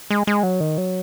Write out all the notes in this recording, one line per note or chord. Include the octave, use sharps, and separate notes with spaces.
G#3
G#3
F#3
D#3
F#3